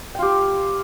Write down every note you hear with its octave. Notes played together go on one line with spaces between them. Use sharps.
F4 G4 G5